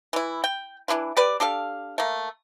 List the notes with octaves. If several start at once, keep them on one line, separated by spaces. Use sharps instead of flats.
E3 E4
G5
E3 D4 E4 F4
G4 B4 D5
D4 G4 A4 F5
A3 A#3